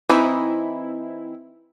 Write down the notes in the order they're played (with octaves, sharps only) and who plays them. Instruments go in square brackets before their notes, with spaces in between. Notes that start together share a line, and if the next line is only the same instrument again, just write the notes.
[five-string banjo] E3 D#4 [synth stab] C4 E4